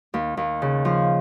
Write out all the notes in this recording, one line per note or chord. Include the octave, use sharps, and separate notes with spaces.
D#2
D#2
C#3
F3